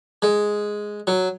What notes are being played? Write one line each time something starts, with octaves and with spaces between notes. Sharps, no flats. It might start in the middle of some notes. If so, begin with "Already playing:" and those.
G#3
F#3